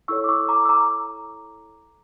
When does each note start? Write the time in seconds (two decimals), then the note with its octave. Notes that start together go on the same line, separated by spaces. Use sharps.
0.08 E4 A4 C#5 C#6 E6
0.24 D6
0.29 C#6 E6
0.49 A#5 D6
0.65 E6
0.69 A#5 D6